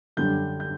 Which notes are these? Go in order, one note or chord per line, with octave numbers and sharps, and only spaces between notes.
F#2 D3 G3 G6
G6